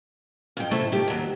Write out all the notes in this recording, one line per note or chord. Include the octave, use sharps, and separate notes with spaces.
F2 G5
A2 C3 A3 E4
D#3 G4
D#2 F#3